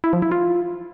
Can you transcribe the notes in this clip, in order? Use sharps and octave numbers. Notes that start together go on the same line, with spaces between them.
E4
F3
E4
F4